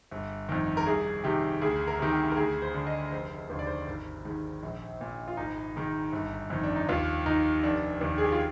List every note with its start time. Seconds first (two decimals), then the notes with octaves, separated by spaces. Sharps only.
0.11 G1
0.49 F2 D#3
0.77 A#4
0.86 C2 G#4
1.24 C3 D#3 G4
1.61 D2 G#4
1.87 A#4
1.99 C3 D#3
2.11 G4
2.31 A#4
2.37 D2 G#4
2.62 C5
2.74 D3
2.87 D#5
3.12 F1 C5
3.49 D#2 D3 C5
3.59 D5
3.67 C5
3.87 G#1
4.25 G#2 D#3
4.63 A#1
5.01 A#2
5.28 F4
5.37 G#1 D#4
5.76 G#2 D#3
6.13 G1
6.50 F2 D#3
6.64 D4
6.76 D#4
6.88 D#2 F4
7.26 D#3 D#4
7.63 F1 D4
8.01 D#2 D#3
8.18 G#4
8.24 G4
8.32 F4